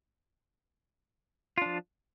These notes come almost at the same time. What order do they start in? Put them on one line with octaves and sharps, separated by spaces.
F4 D4 F3